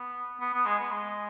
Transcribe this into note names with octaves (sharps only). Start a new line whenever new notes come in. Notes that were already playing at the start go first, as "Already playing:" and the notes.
Already playing: B3
B3
B3
G#3
B3
G#3